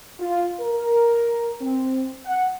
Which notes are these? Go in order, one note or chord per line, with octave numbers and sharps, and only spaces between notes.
F4
A#4
C4
F#5